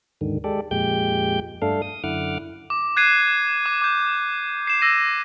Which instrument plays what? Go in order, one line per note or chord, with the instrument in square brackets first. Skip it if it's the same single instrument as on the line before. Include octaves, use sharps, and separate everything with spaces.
[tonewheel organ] D#2 G#2 D3 D#3
G#3 G4 A4 D5
F2 A#2 G#3 G4 G5 G6
G2 A3 D4 A4 F5
D#6
F#2 D3 E4 F#5 D6 F6
[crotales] D6
F#6 G#6 C7 D#7 E7
D6
D6 G6
C7 E7
E6 A#6 D#7